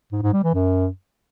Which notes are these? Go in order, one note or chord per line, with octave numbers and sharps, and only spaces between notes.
G#2
G#2
G3
E3
F#2